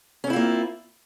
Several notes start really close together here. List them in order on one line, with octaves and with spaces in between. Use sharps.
C#4 C4 E4 F4 A#3